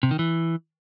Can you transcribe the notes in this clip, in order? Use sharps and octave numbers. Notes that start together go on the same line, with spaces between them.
C3
D#3
E3